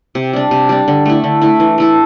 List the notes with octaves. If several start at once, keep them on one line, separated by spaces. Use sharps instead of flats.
C3
G3 D4
C3
G3 D4
D3
A3 E4
D3
A3 E4
E3
A3 E4 A4